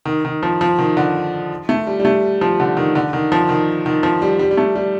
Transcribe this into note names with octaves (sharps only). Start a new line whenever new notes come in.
D#3
D#3
F3
F3
D#3
D3
A3
G3
G3
A3
F3
D3
D#3
D3
D#3
F3
D#3
D#3
F3
G3
G3
G3
A3
G3